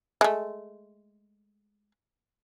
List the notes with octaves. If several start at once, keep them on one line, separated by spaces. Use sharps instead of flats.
G#3 A3